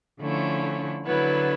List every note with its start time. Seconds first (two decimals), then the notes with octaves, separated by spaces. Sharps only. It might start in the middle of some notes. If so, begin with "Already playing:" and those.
0.21 D3 F3 A3 C#4 E4
1.05 D3 F#3 B3 E4